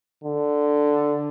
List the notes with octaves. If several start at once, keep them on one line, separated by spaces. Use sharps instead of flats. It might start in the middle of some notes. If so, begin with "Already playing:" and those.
D3